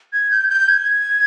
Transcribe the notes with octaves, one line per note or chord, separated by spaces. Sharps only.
G#6
G6
G6
G#6